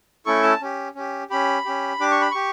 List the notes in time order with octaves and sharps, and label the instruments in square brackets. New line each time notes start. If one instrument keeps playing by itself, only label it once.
[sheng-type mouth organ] A3 C#4 E4 A4 C#6
A5
C#4 G4
C#4 G4
C#4 G4 B5
C#4 G4
D4 G4 D6
C#6
B5
G4 C#6